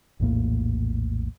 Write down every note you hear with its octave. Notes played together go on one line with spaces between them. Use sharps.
A#1 E2 A2 A#3